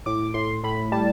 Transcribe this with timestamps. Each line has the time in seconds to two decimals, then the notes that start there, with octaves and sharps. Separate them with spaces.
0.06 A2 D6
0.34 A2 C6
0.63 A2 B5
0.92 G3 A5